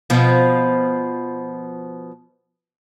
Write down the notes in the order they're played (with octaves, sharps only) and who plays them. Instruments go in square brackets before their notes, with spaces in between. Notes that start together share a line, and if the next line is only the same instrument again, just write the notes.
[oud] B2 F3